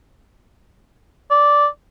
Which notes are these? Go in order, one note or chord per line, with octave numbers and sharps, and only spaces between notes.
D5